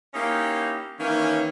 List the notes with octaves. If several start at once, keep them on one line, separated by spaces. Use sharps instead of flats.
A#3 C#4 D#4 E4 G4
D#3 E3 A#3 C#4